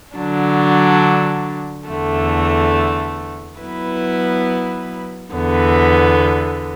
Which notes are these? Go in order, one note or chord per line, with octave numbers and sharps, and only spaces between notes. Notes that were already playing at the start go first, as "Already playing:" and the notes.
D3 F#3 D4
E2 D3 A3
F#3 B3 E4 B4
E2 D3 B3